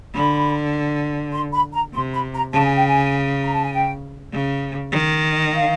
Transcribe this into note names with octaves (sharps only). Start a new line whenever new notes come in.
D3 B5
C6
B5
A#5
C3 C6
B5
A#5
C#3 A5
G#5
G5
G#5
A#5
A5
G#5
G5
C#3
D#3
F5